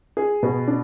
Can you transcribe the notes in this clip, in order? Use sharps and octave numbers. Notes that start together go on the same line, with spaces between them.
G#4
B2
D4